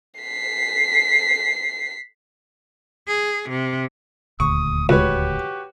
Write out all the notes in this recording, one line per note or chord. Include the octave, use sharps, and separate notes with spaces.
B6 C7
G#4
C3
D#1 D2 C#6 D#6
C#2 F#4 G4 B4 C#5